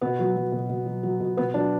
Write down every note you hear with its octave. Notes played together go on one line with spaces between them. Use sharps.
B2 B3
F#3
F#3
B2
B2
F#3
F#3
B2
B2 B3
F#3 D4